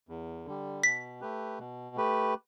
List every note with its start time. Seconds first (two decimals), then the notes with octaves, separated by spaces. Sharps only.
0.09 E2
0.45 D3 G3
0.83 B2 B6
1.21 A3 G4 B4
1.59 B2
1.96 A3 G4 B4